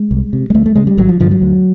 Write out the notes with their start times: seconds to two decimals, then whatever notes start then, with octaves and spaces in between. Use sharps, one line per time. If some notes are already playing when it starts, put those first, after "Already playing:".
Already playing: G#3
0.11 C2
0.33 C3
0.50 G#3
0.54 D2 A3
0.66 A3
0.76 C#3 G#3
0.87 G3
0.97 G#1 F#3
1.09 F3
1.20 G2 D3 F3
1.31 F#3
1.42 D2